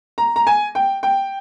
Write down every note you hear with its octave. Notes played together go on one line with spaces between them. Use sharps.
A#5
A#5
G#5
G5
G5